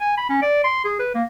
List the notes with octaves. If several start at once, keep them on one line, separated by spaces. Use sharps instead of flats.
G#5
B5
C#4
D5
C6
G#4
B4
A#3